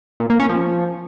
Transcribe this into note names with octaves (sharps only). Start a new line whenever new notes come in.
A#2
A#3
C#4
F3